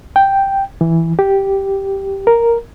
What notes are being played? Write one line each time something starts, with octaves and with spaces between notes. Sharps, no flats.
G5
E3
G4
A#4